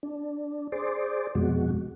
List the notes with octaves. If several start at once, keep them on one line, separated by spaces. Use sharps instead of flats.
D4
G#4 C5 D5
F2 B2 G#3 F#4